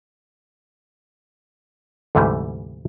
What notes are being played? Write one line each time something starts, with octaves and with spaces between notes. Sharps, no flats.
D2 G#2 C3 E3 G3 A3